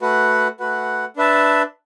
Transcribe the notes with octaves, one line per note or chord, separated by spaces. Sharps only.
A3 F#4 B4 F#5
A3 F#4 B4 F#5
D4 B4 E5 A5